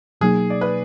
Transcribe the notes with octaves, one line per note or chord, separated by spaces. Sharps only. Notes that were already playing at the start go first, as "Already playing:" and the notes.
B2 F#3 A#3 D#4 G#4
D5
B4